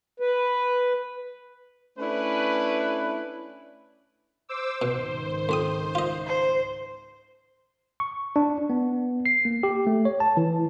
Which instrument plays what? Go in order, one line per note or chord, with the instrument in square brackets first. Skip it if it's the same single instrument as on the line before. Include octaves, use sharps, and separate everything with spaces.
[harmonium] B4
[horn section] A3 C#4 D4 E4 B4
[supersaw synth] C5 D6 E6
[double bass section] C#2 G#2 D#3 [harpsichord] B2 [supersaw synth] C5
[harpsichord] F2 C4 D#6
F4 D#5
[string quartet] C5
[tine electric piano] C#6
D4
B3
C7
A#3
G4
A3
C#5
A5
E3